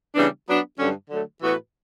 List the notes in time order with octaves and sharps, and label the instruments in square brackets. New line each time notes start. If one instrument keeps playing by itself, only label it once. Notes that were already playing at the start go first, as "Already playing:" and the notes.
[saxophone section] C#3 E3 G3 B3 D4
F#3 B3 D4
G2 D3 F#3 C#4
D3 F#3 A3
A2 E3 B3 F#4 B4